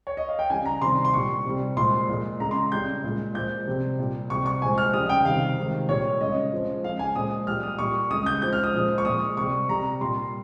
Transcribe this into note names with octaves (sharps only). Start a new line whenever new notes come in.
C#5
D#5
F5
G5
C#3 G3 G#5
A#5
C3 D#3 G3 C6
C6
A#2 G3 C#6
C3 G3
A#2 F3 G#3 C6
A#2 G#3
C#3 G#3 A#5
C6
C#3 G3 G6
A#2 G#3
A#2 F3 G#3 G6
C3 G3
A#2 G3
C3 G3 C#6
C#6
A#2 F3 G#3 G#5
F6
G3 D#6
C#3
G5
C3 D#3 G3 F5
C3 D#3 G#3
A#2 G3 C#5
C#3 G#3 D#5
C#3 F3 G#3
C#3 G#3 F5
G#5
A#2 F3 G#3 D#6
A#2 G3 F6
D#6
A#2 G3 C#6
C#3 G#3 D#6
G6
C#3 F3 G#3 G6
F6
D#6
A#2 F3 G#3
C#6
A#2 G#3 D#6
C3 G3 C#6
C3 G3 A#5
A#2 G3 C6